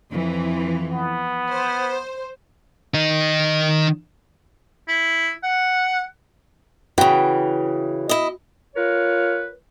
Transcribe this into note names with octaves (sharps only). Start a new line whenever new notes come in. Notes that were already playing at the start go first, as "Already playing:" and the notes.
F2 E3
B3
C5
D#3 D#4
E4
F#5
C#3 E3 F#4 B4 G5
E4 D#5
F4 A#4 B4 C#5